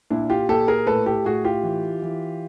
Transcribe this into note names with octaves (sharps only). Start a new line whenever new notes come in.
A#2 D4 E4
F4 G4
A#2 G4 A4
G#4 A#4
A2 A4 B4
G4 A4
A2 F#4 G#4
F4 G4
E3
E3